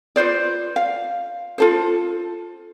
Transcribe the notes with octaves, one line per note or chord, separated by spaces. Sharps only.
F4 B4 C5 D5
F5
F4 A4 C5